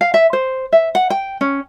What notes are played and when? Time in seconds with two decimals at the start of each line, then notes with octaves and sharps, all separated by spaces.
0.01 F5
0.14 E5
0.33 C5
0.73 E5
0.95 F#5
1.10 G5
1.41 C#4